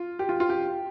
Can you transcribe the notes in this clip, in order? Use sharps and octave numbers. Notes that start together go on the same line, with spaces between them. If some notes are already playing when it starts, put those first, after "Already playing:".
Already playing: F4
G4
F4
F4
G4